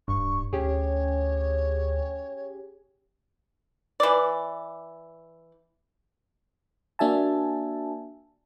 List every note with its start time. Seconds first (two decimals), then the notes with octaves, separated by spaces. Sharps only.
0.08 D1 G2 C#6
0.53 D2 C#4 G4 G#4 C#5
4.00 E3 D5
6.99 A#3 D4 F#4 E5 G#5 A5